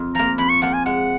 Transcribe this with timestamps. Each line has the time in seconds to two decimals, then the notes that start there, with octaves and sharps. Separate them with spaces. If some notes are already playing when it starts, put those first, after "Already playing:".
Already playing: F2 F4
0.15 F3 A#3 A#5
0.38 F2 B5
0.49 C#6
0.62 F3 A#3 F#5
0.74 G#5
0.85 G#3 F#5